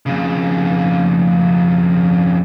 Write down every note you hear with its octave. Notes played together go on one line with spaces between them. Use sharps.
F2 C#3